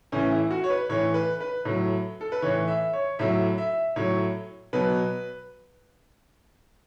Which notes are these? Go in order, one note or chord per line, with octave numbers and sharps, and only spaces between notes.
A2 E3 C#4
E4
F#4
C#5
B4
A2 E3 C#5
B4
B4
A2 F#3
A4
B4
A2 E3 C#5
E5
C#5
A2 F#3 E5
E5
A2 F#3 C#5
B2 F#3 B4